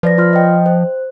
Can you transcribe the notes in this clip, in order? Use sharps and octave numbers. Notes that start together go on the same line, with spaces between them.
F3 B4 D5 A#6
F4 C6 F6
D#5 G5
C5